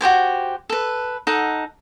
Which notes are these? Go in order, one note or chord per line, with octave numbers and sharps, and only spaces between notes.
F#4 G4 C5 G#5
A4 B4
D#4 A4 F#5